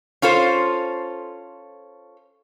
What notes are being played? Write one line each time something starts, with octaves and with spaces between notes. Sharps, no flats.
C#4 F4 A4 C5